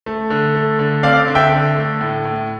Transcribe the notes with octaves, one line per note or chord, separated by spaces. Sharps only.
A3
D3
A3
D3
C4 D5 F5
D3
E5 G5
D3
A3
A2
A2